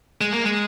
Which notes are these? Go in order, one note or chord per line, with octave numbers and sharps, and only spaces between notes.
G#3
A#3
G#3